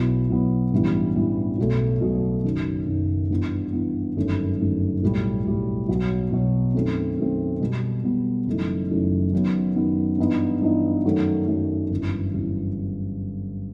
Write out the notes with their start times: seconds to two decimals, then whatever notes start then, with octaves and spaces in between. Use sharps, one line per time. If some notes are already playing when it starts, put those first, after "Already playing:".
Already playing: B1 B2 F#3 B3 E4
0.30 B1 B2 F#3 B3 E4
0.72 A1 G2 E3 G3 B3
1.15 A1 G2 E3 G3 B3
1.58 B1 B2 F#3 A3
2.01 B1 B2 F#3 A3
2.44 F#1 F#2 D#3
2.87 F#1 F#2 D#3
3.31 G2 E3 B3
3.73 G2 E3 B3
4.16 G1 F#2 D#3 A3
4.59 G1 F#2 D#3 A3
5.02 B1 A2 G3
5.45 B1 A2 G3
5.89 B1 B2 F#3 B3
6.31 B1 B2 F#3 B3
6.74 F#2 D#3 A3 C4
7.17 F#2 D#3 A3 C4
7.60 B2 G3 B3
8.04 B2 G3 B3
8.47 F#1 F#2 E3 A3 D#4
8.89 F#1 F#2 E3 A3 D#4
9.33 F#2 D#3 F#3 B3
9.76 F#2 D#3 F#3 B3
10.18 G2 E3 B3 D#4
10.62 G2 E3 B3 D#4
11.04 F#2 D#3 F#3 A3
11.48 F#2 D#3 F#3 A3
11.90 G1 F#2 E3
12.34 G1 F#2 E3